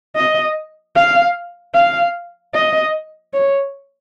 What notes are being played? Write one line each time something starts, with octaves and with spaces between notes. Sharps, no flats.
D#5
F5
F5
D#5
C#5